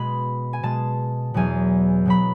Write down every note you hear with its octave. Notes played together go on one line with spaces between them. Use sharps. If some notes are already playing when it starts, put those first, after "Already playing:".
Already playing: B2 G#3 B5
G#5
B2 G#3 A5
E2 B2 F#3 G#5
B2 F#3 B5